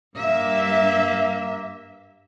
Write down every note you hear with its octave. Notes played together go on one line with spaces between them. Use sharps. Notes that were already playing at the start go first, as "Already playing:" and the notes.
G2 A#3 E5